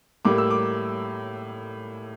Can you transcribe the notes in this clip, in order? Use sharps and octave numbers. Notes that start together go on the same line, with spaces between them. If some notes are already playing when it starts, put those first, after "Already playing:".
A2 G3 A#3 D6
E6
D6